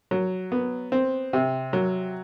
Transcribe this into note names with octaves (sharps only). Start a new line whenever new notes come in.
F#3
B3
C4
C3
F#3